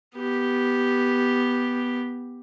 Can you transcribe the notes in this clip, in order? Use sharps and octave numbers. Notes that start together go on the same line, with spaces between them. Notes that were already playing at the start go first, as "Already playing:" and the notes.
B3 G4